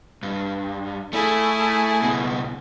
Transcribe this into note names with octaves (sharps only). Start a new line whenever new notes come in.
G2
A3 E4 G#4
C#2 B2